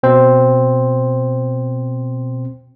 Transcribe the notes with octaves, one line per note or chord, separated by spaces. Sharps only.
B2 C4 C5